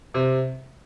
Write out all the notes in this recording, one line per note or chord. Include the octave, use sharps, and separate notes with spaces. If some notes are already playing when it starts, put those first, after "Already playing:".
C3